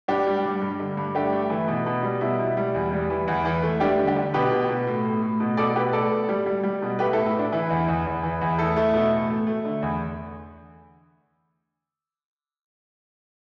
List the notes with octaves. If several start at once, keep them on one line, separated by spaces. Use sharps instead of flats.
G2 D4 G4
G3
G2
G2
D3
G2
A3 D4 G4
A3
E3
B2
B2
G3
B2 E4
B2
G3
E2
G3
E3
E2
E3
A3
G3 D4 G4
D3
D4 G4
D3
B2 G4 B4
B2
B2
A2
A2
A2
B2
B2 A4 D5
B2 G4 B4
A2 A4 D5
A2
G3
G3
G3
B2
A3 G4 B4
E4 A4
A2
E4
A2 D4
E3 E4
E2
E2
E2
E3
E2
A3 E4 A4
A3
B2
A2
A3
A3
D3
E2